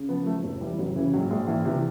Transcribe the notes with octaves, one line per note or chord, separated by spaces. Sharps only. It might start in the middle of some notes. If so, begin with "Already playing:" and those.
Already playing: C#3
F3 B3
A#3
F3 A3
F1
E3 G3
F1 F#3
C#3 E3
A#1 F#3
A#1 G#3
A#1 E3
C3 E3